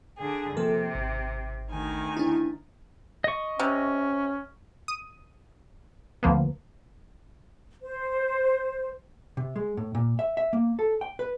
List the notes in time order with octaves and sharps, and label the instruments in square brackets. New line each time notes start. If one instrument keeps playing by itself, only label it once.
[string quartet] D3 G#4
[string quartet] C3 [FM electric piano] F3 A#3 A4
[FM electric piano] G#1
[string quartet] D2 D#3 G#5
[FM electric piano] D4 E4
[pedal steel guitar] D#5 C#6
[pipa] C3 [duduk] C#4
[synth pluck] D#6
D2 F3 A#3 B3
[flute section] C5
[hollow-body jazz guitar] C3
G#3
A2
A#2
E5
E5
A#3
A4
G5
B4